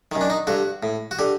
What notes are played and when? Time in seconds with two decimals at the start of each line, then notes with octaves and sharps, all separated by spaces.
0.12 F#2 D#3
0.21 D4
0.30 D#4
0.47 G2 D3 F#4
0.83 A2
1.11 F#4
1.19 D3 G4